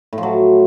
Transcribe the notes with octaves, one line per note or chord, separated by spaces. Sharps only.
A2
F3
F#3